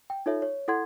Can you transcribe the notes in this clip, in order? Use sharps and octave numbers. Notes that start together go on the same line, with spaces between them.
G5
D#4 F4 A4 C#5 E5
C#5
E4 A4 F#5 C6 G#6